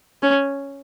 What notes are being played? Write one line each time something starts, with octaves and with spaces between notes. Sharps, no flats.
C#4